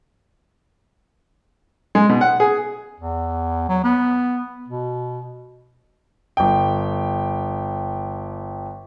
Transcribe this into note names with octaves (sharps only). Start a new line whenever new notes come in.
G#3
B2
F#5
G#4
E2
F#3
B3
B2
G1 G5